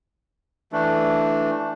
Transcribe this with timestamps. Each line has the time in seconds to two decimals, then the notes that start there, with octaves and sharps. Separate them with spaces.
0.72 E3 A3 D4